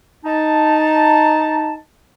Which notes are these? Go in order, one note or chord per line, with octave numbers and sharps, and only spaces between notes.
D#4 A5